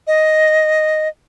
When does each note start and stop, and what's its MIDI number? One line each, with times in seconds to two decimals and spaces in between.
0.07 1.08 75